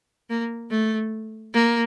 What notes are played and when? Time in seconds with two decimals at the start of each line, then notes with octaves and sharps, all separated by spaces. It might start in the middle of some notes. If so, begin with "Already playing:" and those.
0.30 A#3
0.71 A3
1.54 A#3